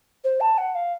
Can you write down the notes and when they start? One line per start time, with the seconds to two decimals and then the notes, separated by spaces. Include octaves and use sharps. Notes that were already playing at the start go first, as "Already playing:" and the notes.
0.24 C5
0.40 A5
0.58 F#5
0.75 F5